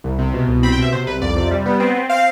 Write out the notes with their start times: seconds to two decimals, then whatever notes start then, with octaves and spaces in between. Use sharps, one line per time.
0.04 C2
0.19 C3
0.34 B2
0.48 C2
0.63 C4 B5
0.72 G5
0.77 B2 E5
0.92 C3 C5
1.06 C2 B4
1.22 F2 D5
1.36 C3
1.51 G3
1.66 B3
1.80 C4
1.95 C4
2.09 C4 F5